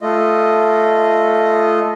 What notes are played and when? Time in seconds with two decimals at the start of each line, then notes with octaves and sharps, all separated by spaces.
0.02 A3 F4 D#5